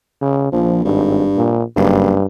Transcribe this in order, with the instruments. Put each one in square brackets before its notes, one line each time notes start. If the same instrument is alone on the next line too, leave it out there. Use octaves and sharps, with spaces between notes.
[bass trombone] C#3
[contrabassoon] A#1 [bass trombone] F3
[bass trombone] G#1 [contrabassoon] G2
[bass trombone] A#2
[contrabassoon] F#1 [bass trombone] G2